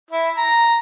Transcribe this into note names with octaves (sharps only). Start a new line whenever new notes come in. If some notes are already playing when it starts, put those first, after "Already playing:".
E4
A#5